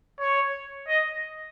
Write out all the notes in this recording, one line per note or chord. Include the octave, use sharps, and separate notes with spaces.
C#5
D#5